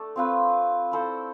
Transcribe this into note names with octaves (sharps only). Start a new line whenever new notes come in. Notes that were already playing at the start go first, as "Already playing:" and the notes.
Already playing: A3 D4 A4
C4 F4 B4
E4 A4 C5